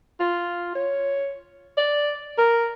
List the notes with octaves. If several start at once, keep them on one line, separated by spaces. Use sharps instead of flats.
F4
C#5
D5
A#4